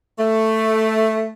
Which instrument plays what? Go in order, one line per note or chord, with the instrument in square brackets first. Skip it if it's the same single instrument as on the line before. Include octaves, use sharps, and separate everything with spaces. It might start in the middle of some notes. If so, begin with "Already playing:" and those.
[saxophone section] A3